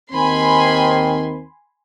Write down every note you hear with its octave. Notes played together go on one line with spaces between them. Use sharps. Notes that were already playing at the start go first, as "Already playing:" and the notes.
D#2 D#3 C4 G#5 B5 C6